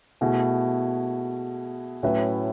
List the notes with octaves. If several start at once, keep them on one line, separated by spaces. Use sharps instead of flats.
B2 A3 E4 G#4
A2 F#3 C#4 E4 B4